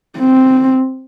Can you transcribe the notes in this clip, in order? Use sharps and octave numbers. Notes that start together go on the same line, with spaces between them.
C4